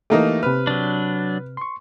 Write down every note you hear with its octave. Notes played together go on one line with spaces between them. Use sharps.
E3 A3 A#3 D#4 G4
C3 B4 F6
F#3 D4
C6 C#6